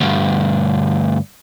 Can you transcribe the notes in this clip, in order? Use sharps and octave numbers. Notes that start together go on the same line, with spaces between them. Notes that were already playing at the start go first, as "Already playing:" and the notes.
D2 G2